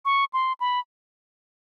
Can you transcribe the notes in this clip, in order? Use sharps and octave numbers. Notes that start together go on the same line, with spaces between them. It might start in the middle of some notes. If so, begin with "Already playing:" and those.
C#6
C6
B5